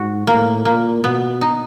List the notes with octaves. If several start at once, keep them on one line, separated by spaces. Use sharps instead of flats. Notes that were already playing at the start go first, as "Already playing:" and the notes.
Already playing: G#2 F#4
A2 A#3
A#2 A#3
B2 B3
D#4